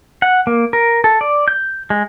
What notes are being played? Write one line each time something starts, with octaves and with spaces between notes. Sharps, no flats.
F#5
A#3
A#4
A4
D5
G6
G#3